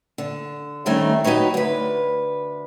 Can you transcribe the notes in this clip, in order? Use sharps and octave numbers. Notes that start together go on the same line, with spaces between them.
D3
D#3 G3 A3 C4 C#4 D#4
F#3 D#4 G4 B4 C#5
D2 B4